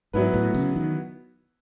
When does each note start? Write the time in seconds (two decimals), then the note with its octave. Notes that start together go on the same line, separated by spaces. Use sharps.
0.13 G#2 F#3 B3 E4 B4
0.34 A2
0.54 C#3
0.76 D#3